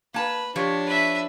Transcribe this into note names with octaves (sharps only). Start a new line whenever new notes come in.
A#3 B4 A5
F3 D4 G4 C#5
B4 E5